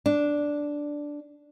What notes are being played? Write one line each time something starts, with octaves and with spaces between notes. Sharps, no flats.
D4